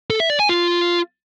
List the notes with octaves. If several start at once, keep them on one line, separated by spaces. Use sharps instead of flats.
A4
E5
D5
G#5
F4